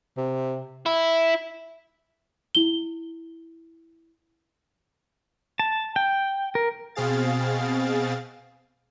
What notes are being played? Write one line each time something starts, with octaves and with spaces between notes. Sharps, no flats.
C3
E4
E4 G7
A5
G5
A#4
B2 C4 G#4 F5 A6